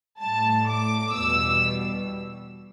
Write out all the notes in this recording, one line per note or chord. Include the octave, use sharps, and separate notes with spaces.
A2 G3 A5
D6
E2 B2 G3 E6